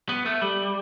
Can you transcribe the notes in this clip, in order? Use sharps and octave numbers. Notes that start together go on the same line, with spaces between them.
B3
A3
G3